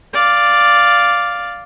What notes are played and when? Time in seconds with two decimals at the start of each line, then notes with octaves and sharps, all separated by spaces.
0.13 D5 F5